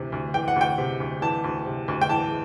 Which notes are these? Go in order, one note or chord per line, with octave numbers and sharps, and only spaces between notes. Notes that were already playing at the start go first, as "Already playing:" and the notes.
Already playing: D2 C3 E3
D2
E3 G5
F#5
D2 G5
C3
D2
E3 A5
D2
C3
D2
G5
E3 A5